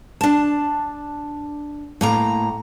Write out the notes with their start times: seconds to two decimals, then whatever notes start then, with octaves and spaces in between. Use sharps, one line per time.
0.21 D4 A5
2.01 A2 A#3 A#5